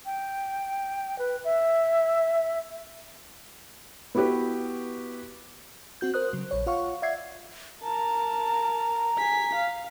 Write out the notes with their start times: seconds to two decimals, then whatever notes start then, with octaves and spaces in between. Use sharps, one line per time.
0.06 G5
1.19 B4
1.44 E5
4.15 B3 E4 F#4 G4 B4
6.01 C4 F#4 G6
6.14 A#4 C5 D#6 F#6
6.33 C#3 F#3
6.51 A#1 C#5
6.66 F4 C#5 F5 F#5 C#6
7.02 D5 E5 F#5 G#6 C7
7.83 A#4 A5 A#5
9.17 G#5 B6
9.55 F5